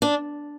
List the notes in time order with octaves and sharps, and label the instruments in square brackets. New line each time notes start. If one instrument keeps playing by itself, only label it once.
[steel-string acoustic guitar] D4